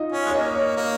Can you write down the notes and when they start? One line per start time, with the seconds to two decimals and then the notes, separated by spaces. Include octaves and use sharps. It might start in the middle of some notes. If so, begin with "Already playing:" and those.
Already playing: D#4 F4 D#5
0.12 C#4
0.26 G#3
0.30 C#5
0.34 A#3 D#5
0.55 C#5
0.77 A#3